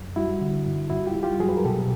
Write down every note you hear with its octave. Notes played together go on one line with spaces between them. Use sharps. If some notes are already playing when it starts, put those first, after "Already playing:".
Already playing: F#2
G3 E4 F#4
D3
G2
G2 E4 F#4
F4 G4
G3
F4 G4
F#3 F#4 G#4
B4
A#4
B2 G4 A4